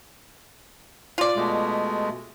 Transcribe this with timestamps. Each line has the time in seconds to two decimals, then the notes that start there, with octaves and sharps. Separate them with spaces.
1.18 F4 D5
1.36 B2 G#3 A3